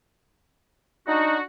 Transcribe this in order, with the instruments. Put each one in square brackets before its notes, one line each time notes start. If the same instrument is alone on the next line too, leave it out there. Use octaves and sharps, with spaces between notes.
[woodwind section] D4 F#4 [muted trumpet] D#4